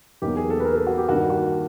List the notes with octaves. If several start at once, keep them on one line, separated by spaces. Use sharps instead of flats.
E2 B2 F#3 A#3 D#4 G4
G#4
A4
B4
A#4
A4
F#4
G4
G2 D#3 G3 A#3 D4 F#4
F#4